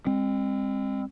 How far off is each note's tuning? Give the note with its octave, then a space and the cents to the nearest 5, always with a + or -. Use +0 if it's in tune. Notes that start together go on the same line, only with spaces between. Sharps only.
G#3 -40 C4 +20